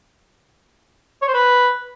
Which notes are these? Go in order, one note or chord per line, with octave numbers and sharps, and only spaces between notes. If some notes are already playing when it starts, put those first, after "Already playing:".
C#5
C5
B4